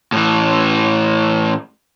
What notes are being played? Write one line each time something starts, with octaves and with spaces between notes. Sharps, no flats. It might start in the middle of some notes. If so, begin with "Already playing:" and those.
A2 E3